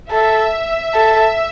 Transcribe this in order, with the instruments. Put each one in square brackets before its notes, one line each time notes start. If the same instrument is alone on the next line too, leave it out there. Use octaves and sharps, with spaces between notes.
[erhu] A4 [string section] E5
[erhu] A4